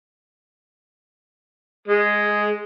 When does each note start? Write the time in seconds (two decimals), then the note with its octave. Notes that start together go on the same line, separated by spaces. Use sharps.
1.88 G#3